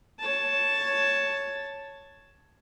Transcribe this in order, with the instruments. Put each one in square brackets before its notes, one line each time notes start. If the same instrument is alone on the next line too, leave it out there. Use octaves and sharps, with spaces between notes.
[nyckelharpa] C#5 A5